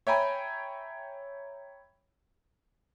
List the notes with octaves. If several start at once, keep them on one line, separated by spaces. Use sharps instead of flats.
C#5 E5 G5 G#5 A#5 B5